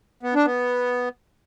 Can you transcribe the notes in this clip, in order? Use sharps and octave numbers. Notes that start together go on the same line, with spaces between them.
B3
D4
B3